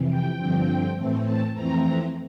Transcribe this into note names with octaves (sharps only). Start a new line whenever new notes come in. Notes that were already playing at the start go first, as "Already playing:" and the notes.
Already playing: F2 C3 E3
G5
G2 D3 F3 C4
A2 E3 A3 C4
A5
F2 E3 A3 C4 A#5